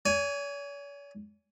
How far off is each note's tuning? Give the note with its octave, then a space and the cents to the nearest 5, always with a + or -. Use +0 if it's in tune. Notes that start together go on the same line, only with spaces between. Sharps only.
C#5 +45 G#5 +0